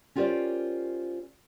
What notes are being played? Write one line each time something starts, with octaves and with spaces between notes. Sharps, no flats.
C#4 F4 G4 A#4 C5 D5